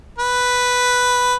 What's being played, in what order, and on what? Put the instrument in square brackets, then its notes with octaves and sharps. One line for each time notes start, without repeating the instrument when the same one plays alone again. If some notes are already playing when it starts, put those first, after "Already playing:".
[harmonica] B4